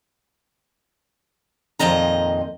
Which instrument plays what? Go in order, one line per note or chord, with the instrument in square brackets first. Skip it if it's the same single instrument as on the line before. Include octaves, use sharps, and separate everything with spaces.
[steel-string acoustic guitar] F2 A#2 D#3 D#5 A#5